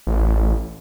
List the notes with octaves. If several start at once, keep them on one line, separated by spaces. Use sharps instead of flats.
A1